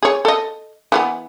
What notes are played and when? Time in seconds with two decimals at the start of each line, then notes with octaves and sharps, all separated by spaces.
0.03 G#4 C#5
0.25 A4 D#5
0.92 E3 G3 B3